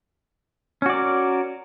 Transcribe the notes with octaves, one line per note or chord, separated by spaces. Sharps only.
C#4 F#4 A#4 D5